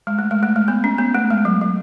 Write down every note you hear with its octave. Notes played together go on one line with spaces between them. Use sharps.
G#3
A3
G#3
A3
G#3
B3
C#4
B3
A3
G#3
F#3
F#3